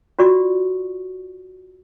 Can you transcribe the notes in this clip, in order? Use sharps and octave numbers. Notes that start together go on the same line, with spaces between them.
F4 F#4 D5 C#6